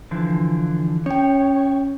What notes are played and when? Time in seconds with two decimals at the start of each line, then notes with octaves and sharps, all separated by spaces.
0.11 D3 E3 F3
1.06 C#4 C#5 G5